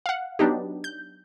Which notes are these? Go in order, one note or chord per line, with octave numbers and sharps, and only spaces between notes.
F5 F#5
F#3 B3 D4 D#4 G4
G6